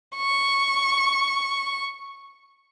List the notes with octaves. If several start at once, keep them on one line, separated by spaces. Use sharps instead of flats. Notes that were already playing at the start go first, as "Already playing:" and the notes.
C#6